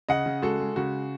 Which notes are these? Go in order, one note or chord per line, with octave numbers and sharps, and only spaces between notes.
C#3 D#5 F#5
C#3
G#3 F#4 A4
G#3
C#3 F#4